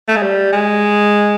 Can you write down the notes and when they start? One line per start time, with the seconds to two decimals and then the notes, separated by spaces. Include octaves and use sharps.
0.08 A3
0.16 G#3
0.22 G3
0.53 G#3